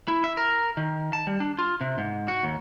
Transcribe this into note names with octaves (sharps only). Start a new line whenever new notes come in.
E4
E5
A#4
D#3
A5
G3
D4
F4
C3
G#2
F#4
D#2